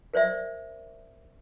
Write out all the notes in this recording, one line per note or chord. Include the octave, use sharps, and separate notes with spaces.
A#4 C5 D5 E5